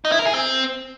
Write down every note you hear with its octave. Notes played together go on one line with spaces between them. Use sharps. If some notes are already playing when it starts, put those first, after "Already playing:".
D#4
E4
A#4
G#4
C4